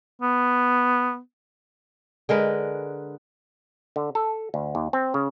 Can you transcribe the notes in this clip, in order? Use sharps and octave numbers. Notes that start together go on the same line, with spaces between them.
B3
D3 G#3 A#4 B4
D3
A4
D2
D#2
C4
C#3